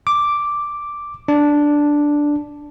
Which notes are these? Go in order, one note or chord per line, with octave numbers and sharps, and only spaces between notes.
D6
D4